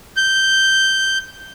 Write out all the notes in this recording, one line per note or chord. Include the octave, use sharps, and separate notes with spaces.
G6